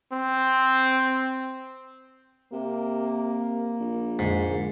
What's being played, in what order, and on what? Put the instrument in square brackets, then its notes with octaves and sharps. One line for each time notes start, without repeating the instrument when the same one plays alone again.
[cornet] C4
[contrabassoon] C3 [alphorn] A#3
[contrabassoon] A#1
[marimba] F2 D3 G#3 [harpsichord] G#2